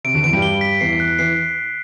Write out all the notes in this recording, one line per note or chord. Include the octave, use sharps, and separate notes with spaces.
C3 D7
D2 D3
E2 E3 D7
G2 G3
G7
B6
E2 E3 C7
F#6
E3 C7